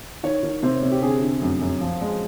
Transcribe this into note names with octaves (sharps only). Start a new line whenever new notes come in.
D#3 C#5
D#3
C3 C5
C3
G4
D3 G#4
D3
F#2
F#2
F3
G#3